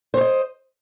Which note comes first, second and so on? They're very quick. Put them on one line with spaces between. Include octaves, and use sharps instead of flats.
C5 C#5 D#5